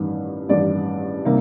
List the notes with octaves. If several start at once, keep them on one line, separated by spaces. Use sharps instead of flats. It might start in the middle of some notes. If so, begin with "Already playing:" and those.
Already playing: A1 G2 D#3
A1 G2 D#3 D5
C3 D#3 G3 A#3